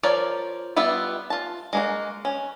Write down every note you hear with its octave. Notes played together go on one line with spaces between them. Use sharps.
F3 A#4 C#5 D5
G3 B3 F4 E5 F#5
F4 A5
G#3 A#3 F#4
C#4